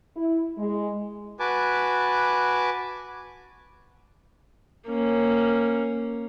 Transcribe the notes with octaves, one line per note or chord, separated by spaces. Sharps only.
E4
G#3
F#4 B4 G#5 A5 D6
A#3 C#4